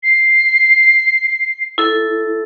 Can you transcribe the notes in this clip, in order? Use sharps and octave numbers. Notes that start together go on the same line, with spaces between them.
C7
E4 A4